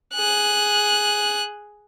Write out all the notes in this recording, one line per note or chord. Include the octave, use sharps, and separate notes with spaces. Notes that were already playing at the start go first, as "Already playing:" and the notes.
G#4 F#6